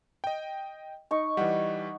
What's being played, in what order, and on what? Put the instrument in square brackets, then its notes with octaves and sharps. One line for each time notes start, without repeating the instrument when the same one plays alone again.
[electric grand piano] D#5 G5
[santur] D#4 C#6
[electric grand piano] E3 G3 [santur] F#5